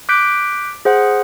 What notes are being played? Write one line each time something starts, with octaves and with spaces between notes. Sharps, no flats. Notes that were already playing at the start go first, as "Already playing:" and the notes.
D6 F#6 G6 B6 D7
G#4 C5 F#5